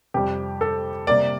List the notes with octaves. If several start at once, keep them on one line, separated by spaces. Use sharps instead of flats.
F2 C3 G3 G4
A4
C3 G3 A#3 D5